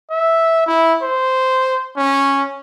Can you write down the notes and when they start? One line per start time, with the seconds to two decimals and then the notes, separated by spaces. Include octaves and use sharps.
0.11 E5
0.67 E4
1.02 C5
1.97 C#4